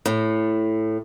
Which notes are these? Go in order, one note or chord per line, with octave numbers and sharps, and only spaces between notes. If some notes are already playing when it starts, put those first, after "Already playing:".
A2